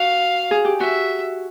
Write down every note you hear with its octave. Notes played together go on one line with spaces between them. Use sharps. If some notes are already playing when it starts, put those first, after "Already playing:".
Already playing: F#4 F5
G#4
G4
F#4 E5